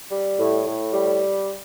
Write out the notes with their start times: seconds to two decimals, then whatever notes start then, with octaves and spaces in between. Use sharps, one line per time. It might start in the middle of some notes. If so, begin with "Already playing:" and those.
0.11 G3
0.39 A2
0.65 A2
0.92 G3